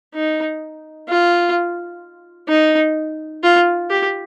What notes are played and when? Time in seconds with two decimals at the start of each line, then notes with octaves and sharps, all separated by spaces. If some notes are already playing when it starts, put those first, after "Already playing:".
0.14 D#4
1.09 F4
2.49 D#4
3.43 F4
3.90 G4